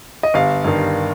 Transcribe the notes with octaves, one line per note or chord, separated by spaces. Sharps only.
D#5
G1 F5
G2 D#3